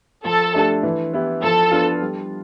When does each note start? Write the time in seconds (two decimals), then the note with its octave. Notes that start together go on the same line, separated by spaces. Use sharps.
0.25 F3 A4
0.54 A3 D4 G4
0.83 E3
1.13 B3 E4 G4
1.43 F3 A4
1.71 B3 D4 F4
2.01 G3